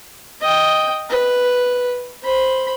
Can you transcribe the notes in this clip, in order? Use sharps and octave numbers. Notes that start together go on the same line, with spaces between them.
D#5 G5
B4
C5 B5